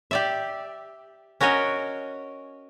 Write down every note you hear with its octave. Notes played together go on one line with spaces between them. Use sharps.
G4 D5 E5
C#4 F#4 A#4 C#5 D#5